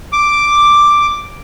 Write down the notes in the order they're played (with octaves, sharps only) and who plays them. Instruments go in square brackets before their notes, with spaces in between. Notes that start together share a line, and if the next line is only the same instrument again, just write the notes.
[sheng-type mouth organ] D6